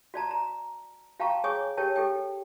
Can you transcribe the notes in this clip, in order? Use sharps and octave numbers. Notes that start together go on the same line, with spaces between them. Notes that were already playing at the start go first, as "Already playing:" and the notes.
F#4 D5 A5 A#5
A#5
F#4 F5 G5 A5 A#5 C#6
G#4 C#5 G#5 C#6 D#6
G4 A#4 C#5 G5 A5
G4 A4 G5